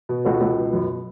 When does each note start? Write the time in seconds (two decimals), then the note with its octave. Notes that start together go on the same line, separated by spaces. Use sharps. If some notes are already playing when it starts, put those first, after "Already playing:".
0.09 B2
0.25 C#2 F#4 A4
0.41 C#2
0.56 B2
0.73 F#2